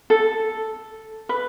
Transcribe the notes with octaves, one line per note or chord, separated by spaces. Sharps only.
A4
B4